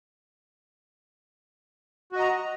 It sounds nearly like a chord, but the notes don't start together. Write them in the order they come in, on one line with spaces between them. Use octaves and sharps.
F#4 D#5 A#5